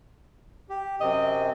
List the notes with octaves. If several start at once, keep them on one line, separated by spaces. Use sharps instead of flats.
G4
F#2 C3 C4 D#5